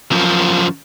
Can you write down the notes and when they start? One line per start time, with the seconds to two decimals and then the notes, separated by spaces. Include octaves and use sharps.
0.11 F#2 F3